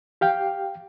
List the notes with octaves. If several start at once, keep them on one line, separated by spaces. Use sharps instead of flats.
G4 F5 G5